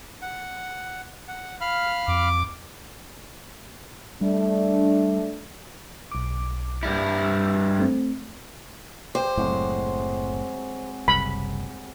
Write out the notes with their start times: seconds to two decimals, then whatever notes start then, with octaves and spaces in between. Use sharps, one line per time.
0.22 F#5
1.28 F#5
1.61 F5 B5 F6
2.08 F2 D6
4.21 G3 A3 D4
6.11 B1 D6
6.83 G2 G3 E4
7.24 E6
7.79 A3 C4
9.15 G4 C5 F5
9.37 F#1 A2 C3 F#3 G#3
11.08 F#1 C2 B5